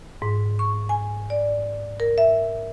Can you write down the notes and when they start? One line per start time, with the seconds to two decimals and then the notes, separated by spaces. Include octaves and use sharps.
0.22 G#2
0.59 C#6
0.89 G#5
1.30 D5
2.00 A#4
2.18 E5